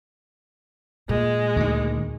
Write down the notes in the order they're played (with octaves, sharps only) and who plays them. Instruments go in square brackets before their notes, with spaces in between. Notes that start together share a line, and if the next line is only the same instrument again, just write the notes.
[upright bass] A#2 [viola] G#3
[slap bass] D2 D#3